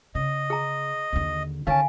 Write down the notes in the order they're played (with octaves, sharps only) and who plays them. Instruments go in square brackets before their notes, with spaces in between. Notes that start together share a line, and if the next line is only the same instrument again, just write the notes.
[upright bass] C#3 [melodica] D#5
[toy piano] G#4 A#5
[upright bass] D#2 D3
[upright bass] D3 D#3 [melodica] C#4 A5 [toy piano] F5 G#5